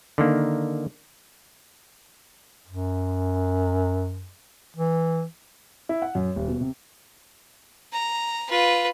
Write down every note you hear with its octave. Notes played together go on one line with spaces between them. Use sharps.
D3 D#3 A#3
F#2
E3
E4
F#5
F#2
D#1
B2
C3
A#5
F4 B4